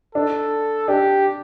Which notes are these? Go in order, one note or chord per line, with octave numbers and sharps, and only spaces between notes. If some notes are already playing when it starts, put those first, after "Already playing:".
D4 A4
D4 G4